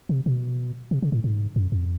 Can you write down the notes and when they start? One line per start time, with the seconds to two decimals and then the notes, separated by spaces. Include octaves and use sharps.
0.09 C3
0.26 B2
0.91 C3
1.02 C#3
1.12 A2
1.24 G#2
1.56 F#2
1.72 F2